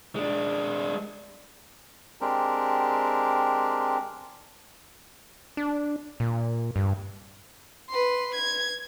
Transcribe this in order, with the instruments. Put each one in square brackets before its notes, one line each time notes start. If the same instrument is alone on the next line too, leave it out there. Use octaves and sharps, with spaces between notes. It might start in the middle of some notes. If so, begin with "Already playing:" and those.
[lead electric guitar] G#3 D4
[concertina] G#3 C4 D4 G4 A#4
[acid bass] D4
A#2
G2
[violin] B4 C6
G#6